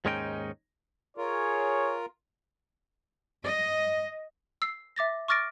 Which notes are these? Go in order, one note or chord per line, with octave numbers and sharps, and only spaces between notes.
D#2 G#2 G#3 C#4 D#4 G5
F4 G#4 A#4 C#5
D#5
E6 C7
E5 D6 A6 A#6
C#6 D6 F6 A6 A#6 D7